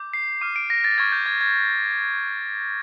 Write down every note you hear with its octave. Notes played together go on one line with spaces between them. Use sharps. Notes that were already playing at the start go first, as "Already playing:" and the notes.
Already playing: D6 G6
C7
D6 F6 D#7
D7
A#6
A6
C#6 F6 G#6
G6
G#6
G#6